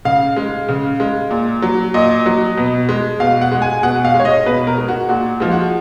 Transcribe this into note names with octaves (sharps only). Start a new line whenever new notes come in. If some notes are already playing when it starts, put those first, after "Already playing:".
C#3 F5
G#3
C#3
G#3
A#2
F#3
A#2 D#5
F#3
B2
G#3
B2 F5
F#5
G#3
G#5
B2 F#5
F5
G#3
C#5
D#5
B2 B4
A#4
G#3
F#4
A#2 F#4
F3 G#3
F#4